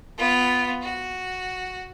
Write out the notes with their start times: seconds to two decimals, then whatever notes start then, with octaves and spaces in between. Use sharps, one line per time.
0.18 B3 F4
0.82 F#4